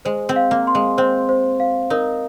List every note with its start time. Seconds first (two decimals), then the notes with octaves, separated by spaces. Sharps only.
0.05 G#3 C5
0.29 C4
0.36 F5
0.51 A#3
0.67 C6
0.75 G#3
0.98 C4 C5
1.29 C5
1.60 F5
1.90 D#4 A#4